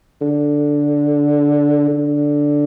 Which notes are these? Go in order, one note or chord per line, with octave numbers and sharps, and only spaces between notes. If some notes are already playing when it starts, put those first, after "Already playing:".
D3
D3